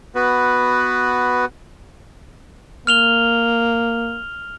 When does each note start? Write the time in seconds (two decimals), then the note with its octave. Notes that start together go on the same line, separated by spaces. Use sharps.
0.15 B3 F#4 B4
2.87 A#3 F6 F7 G7